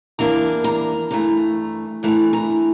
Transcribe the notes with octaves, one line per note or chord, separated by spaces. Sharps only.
E2 E3 G3 A#3 D4 A#5
A#5
G2 E3 A3 A#5
E2 E3 A3 D4 A#5
A#5